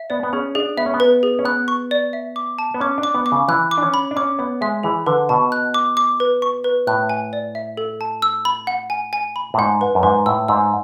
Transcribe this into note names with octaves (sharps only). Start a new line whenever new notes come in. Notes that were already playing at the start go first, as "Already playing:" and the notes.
Already playing: E5
B3 D5
B3
C#4 G#4
D4 G#4
B3 E5
C#4
B3
B4
G#4
C#4
B3 F#6
C#6
D5
E5
D6
A5
B3
C#4 D6
D4
D6
B3
D6
C#3
E3 F#6
D6
D4
C#4
B5
D4
C#4 D6
B3 C#5
G#3 E5
E3 G#4
D3 B4
B2 A5
F#6
D6
D6
B4
C#6
B4
A2 F#6
G#5
D5
E5
A4
A5
E6
B5
F#5
G#5
G#5
B5
A2
G#2 F#5
B4
F#2
G#2 B4
A2 E6
G#2 E6